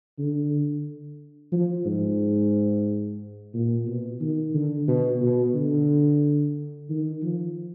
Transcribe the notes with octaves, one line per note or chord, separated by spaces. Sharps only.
D3
F3
G#2
A#2
B2
D#3
D3
B2
B2
D3
D#3
F3